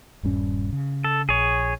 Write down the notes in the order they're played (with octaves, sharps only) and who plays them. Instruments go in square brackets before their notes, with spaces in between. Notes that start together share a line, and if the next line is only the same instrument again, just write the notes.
[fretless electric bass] D#1 G2 C#4
C#3
[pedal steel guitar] A4
[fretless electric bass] A#1 [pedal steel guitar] G#4 C#5